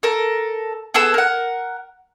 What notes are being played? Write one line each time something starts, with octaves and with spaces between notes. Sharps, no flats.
A4 A#4
B3 G#4 A4 E6
A#4 F#5